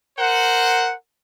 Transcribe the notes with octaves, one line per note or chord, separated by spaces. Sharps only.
A#4 C5 F#5